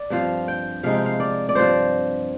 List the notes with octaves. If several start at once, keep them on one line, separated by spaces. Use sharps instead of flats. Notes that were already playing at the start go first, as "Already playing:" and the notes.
Already playing: D5
G2 F3 C4 F5
G5
C3 F3 G#3 D#4 F5
G5
F5
D5
D5
G2 F3 C4 C5